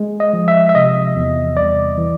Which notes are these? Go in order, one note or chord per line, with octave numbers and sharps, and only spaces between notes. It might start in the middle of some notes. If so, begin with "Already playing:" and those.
Already playing: G#3
D#5
F3
E5
E5
C3 D#5
E2
C2 D5
E3